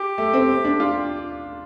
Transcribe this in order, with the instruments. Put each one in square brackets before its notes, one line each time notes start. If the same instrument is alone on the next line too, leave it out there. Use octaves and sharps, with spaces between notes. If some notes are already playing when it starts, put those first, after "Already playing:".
Already playing: [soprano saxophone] G4
[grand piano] A3
C4
D4
F4